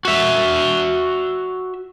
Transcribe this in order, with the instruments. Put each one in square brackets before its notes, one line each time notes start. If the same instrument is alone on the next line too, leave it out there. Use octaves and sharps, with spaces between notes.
[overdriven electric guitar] F#4 E5